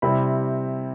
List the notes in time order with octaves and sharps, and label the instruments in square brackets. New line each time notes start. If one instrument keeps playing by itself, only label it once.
[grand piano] C3 G3 C4 E4 B5